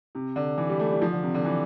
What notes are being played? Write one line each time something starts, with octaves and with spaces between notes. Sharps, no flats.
C3
D3
E3
G3
A3
G3
F3
D3
C3
D3
E3